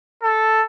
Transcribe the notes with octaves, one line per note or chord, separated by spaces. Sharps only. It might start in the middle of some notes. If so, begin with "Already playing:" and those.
A4